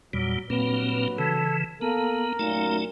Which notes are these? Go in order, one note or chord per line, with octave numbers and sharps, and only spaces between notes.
E2 A#2 F#3 G3
G2 A#2 F#3 A#3 C4 B4
C#3 E3 A4
A#3 B3 A4 A#4
F#2 A#2 A3 D#4